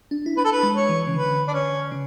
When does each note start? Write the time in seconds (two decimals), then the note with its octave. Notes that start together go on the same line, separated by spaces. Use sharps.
0.11 D4
0.26 E4
0.37 D4 B4
0.44 A4
0.51 B4
0.63 G#3
0.76 C#5
0.89 E3
1.07 C#3
1.14 D3 B4
1.48 D4
1.53 C#4
1.92 C#3